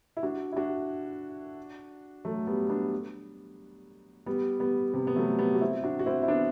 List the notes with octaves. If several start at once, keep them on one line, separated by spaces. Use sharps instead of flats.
E4
D4 F#4
E4
D4 F#4
F#3 A3
G3 B3
B3 D4
G3 B3
G3 B3
C3
B3
F#3 A3
G3 B3
F#4
C4 E4
D4 F#4
F#4
C4 E4
E4
B3 D4